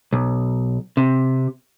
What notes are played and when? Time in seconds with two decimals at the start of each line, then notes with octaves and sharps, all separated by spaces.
0.13 B1
0.97 C3